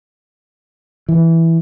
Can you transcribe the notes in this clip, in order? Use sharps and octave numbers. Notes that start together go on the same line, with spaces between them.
E3